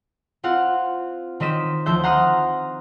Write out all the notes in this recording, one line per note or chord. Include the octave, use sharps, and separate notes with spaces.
C4 F4 F5 F#5
D#3 C4 D#5 B6 E7
D2 F3 C5 E5 G6
F#5 A#5 C6 D#6 F6